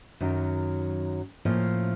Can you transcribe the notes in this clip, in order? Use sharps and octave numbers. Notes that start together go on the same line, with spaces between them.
F#2 D#3 F#3
A2 F3 A#3 C#4